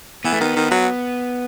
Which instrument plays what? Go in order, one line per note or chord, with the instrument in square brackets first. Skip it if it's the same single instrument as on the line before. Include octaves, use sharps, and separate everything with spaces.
[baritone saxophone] E3 [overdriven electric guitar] B3
[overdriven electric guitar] A3
[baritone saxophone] D#3 [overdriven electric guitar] B3
[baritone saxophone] D#3
F#3